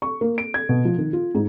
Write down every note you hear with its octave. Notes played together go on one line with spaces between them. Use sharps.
C#6
A#3
D7
G#6
B2
F3
D#3
F4
G#2